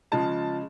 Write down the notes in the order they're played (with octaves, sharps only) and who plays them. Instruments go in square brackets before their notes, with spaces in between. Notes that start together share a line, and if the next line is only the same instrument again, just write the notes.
[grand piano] C#3 F3 G#3 A5